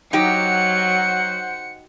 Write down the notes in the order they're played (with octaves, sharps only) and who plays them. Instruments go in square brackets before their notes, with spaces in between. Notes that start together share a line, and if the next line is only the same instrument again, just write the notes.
[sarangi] F#3 [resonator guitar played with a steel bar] D#4 G4 [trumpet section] C5 F#5 [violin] C#7